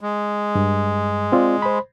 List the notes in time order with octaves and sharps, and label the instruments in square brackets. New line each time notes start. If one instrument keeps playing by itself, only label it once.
[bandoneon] G#3
[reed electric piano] G2
C4 F4 D5
C5 B5